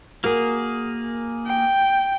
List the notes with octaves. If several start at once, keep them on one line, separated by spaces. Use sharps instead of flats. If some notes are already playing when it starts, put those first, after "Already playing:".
A#3 F#4 G#4 A#4
G5